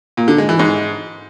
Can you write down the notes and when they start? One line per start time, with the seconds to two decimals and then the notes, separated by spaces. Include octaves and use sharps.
0.17 A#2
0.28 D3
0.38 G#3
0.49 E3
0.59 G#2